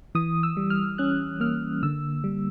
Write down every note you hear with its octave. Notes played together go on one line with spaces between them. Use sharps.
E3 D#6
E6
G3
F6
C#4 F#6
A#3 F6
D3 E6
G3